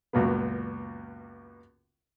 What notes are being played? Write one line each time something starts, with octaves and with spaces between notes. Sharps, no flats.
C#2 F#2 A#2 F#3 B3